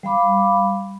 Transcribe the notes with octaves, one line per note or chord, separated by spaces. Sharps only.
G3 F5 B5 D6